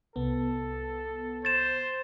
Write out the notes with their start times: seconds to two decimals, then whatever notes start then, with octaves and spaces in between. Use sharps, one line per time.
0.16 C2 B3 A4
1.45 C5 A6 E7